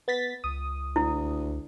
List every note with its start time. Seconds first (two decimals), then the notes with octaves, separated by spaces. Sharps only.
0.08 B3 A6 B6
0.44 C#2 D#6
0.96 D2 E4